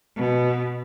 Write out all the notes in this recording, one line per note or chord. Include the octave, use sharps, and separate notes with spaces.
B2